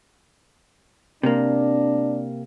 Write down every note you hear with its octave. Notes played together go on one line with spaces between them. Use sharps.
C3 A#3 D4